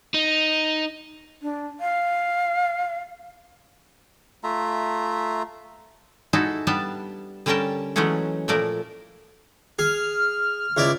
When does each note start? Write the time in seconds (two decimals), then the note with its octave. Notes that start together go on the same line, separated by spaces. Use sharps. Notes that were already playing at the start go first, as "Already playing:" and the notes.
0.14 D#4
1.42 D4
1.80 F5
4.44 A3 F4 E5 A#5
6.33 G#3 D#4 E4 F#4 A4
6.67 G3 B3 D4 A5
7.46 D3 G3 C#4 A#4 G5 A5
7.96 E3 F#3 G#3 A3 C#4 F#5
8.48 A#2 F3 A3 A#4 D5
9.79 G#4 F6
10.77 C#2 E4 D5